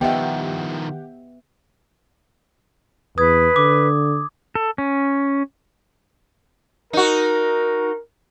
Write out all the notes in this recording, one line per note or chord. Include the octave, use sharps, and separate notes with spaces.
D#3 F3 B3 G4 D#5 E5 F#5 G5
E2 B4 D#6 G#6
D3 D6
A4
C#4
D#4 F#4 A#4